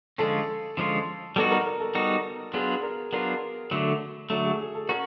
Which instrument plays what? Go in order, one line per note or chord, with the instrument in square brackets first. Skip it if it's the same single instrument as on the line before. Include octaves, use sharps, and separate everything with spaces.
[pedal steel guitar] D3 F3 G#3 C#4 F4 [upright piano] A4
[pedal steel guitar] D3 F3 G#3 C#4 F4
[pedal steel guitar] G3 B3 D#4 F#4 [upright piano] A4
[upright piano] A#4
A#4
A4
[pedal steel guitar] G3 B3 D#4 F#4
[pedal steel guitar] F#3 B3 D4 F4 [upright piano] G#4
[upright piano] A#4
[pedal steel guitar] F#3 B3 D4 F4 [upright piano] A#4
[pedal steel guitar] D3 F#3 A3
[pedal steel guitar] D3 F#3 A3 [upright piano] A4
[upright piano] G#4
G#4
A4
[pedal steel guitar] C#4 F#4 [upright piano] A#4